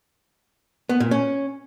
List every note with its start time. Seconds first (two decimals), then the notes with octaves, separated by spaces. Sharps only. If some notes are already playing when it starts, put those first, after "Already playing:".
0.89 B3
1.00 A#2
1.11 C#4